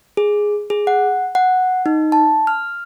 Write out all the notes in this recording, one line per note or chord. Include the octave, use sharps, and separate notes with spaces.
G#4
G#4
F#5
F#5
D#4
A5
F6